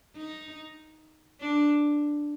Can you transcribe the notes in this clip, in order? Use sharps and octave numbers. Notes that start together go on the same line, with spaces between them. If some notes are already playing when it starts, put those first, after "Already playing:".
D#4
D4